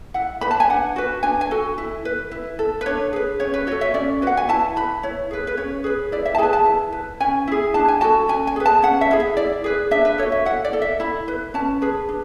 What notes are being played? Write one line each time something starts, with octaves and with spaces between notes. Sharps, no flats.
E4 F#5
B4 B5
A5
G#5
D4 F#5
F#4 B4
D4 G#5
G#5
F#4 A4
E4
B4
E4
A4
B4
D4 C#5
G#4 B4
C#4 C#5
B4
F#4 A4 C#5
E5
C#4 D5
F#4 B4 F#5
G#5
E4 A5
B4 B5
E4 C#5
G#4 B4
B4
C#4 C#5
G#4 B4
E4 D5
E5
A5
G#4 B4 G#5
A5
E4
B4
C#4 G#5
E4 G#4
D4 A5
G#5
F#4 A4 A5
C#4 G#5
G#5
G#4 B4
A5
C#4 F#5
E5
E4 G#4
E5
E4 D5
G#4 B4
D4 E5
B4
F#4 A4 C#5
E5
E4 F#5
D5
A4
E5
E4 B5
B4
C#4 A5
G#4 B4
D4